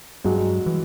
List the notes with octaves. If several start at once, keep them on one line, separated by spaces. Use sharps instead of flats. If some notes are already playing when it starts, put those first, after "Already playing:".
G2 F#3 G#3
E3